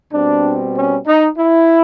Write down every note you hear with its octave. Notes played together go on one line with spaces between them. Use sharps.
B2 G3 C4 D4
C#4
D#4
E4